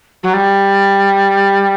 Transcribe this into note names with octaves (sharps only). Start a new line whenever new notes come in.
F#3
G3